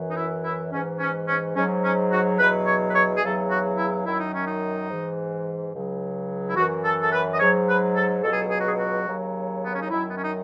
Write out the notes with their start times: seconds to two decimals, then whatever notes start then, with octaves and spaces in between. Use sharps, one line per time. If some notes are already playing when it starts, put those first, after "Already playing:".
Already playing: F#2 E3
0.10 D#4
0.16 E4
0.44 E4
0.72 G#2 E3 C#4
1.00 C#4
1.28 C#4
1.55 G#2 F#3 C#4
1.83 C#4
2.11 F#4
2.39 E2 B2 F#3 B4
2.67 C#5
2.90 B4
2.95 C#5
3.16 G#4
3.22 E2 C#3 F#3 A4
3.50 F#4
3.78 E4
4.06 F#2 D#3 F#3 E4
4.19 D#4
4.34 C#4
4.47 D#4
4.89 G#2 E3
5.73 C#2 C#3 F#3
6.49 E4
6.56 F#2 E3 F#4
6.84 A4
7.01 A4
7.12 B4
7.32 D#5
7.40 G#2 F#3 C#5
7.68 B4
7.95 A4
8.23 C#2 B2 F#3 A4
8.31 G#4
8.41 A4
8.51 G#4
8.60 F#4
8.68 G#4
8.79 F#4
9.07 D#2 C#3 F#3
9.65 B3
9.74 C#4
9.82 D#4
9.90 F#2 D#3 F#3 E4
10.09 B3
10.17 C#4
10.24 D#4